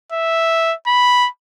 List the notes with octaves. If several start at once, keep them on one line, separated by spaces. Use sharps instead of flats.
E5
B5